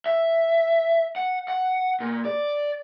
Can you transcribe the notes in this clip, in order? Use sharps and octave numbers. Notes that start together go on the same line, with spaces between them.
E5
F#5
F#5
A#2
D5